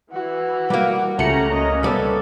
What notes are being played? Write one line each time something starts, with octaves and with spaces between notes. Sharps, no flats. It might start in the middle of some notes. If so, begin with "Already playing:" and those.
E3 F#4
G3 A#3
C#2 A3 C#4 G4 A#5 F#6 C#7
A#3 C#4 D#5
G3 B3 A4